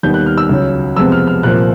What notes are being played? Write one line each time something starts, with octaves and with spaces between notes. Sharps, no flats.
D#2 D#3 G3 B3 G6
F#6
F6
E6
C#2 C#3 F#3
F2 C3 F3 G#3 B3 E6
F6
F6
C2 A#2 F3 A#3 F#6